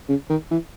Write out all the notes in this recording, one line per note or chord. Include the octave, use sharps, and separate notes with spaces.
C#3
D#3
E3